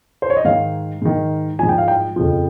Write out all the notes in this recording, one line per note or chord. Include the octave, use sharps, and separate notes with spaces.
C5
C#5
D#5
G#2 D#3 F5
G#2 D#3
G#2 F3 G#5
G5
F5
G5
F2 C#3 F3